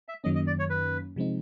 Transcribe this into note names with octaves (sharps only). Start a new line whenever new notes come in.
E5
F#2 D#3 F#3 A#3 C#4 D#5
D#5
D5
C#5
B4
C3 F3 G#3 C4 D#4